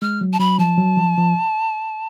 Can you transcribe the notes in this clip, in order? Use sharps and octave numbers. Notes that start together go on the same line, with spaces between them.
G#3 F6
F#3
A5
F#3 B5
F3 A5
F#3
F3
F3